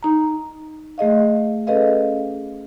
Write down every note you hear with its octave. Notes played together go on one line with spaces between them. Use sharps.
D#4 A#5
A3 G#4 D#5 F5
C#4 G#4 A4 B4 D#5 F5